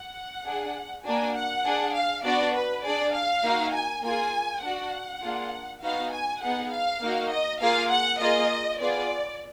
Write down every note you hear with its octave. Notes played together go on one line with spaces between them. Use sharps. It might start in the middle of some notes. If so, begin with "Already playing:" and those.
Already playing: F#5
D4 G#4
A#3 D4 F#4 G#5
F#5
D4 G#4
F5
B3 D4 F#4 D5
B4
D4 G#4 D5
F5
A#3 D#4 F#4
G#5
A#3 F4 G#4 G#5
D4 F#4 F#5
A#3 D4 F4 G#4
B3 D#4 F#4 F5
G#5
B3 D#4 G#4 F#5
F5
A#3 D#4 F#4
D#5
A#3 F4 G#4 F5
F#5
A#3 F4 G#4 D#5
B3 F4 G#4 D5